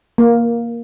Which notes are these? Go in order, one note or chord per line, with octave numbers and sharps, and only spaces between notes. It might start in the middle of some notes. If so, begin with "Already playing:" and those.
A#3